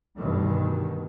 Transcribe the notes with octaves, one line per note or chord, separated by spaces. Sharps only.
D2 G2 B2 D#3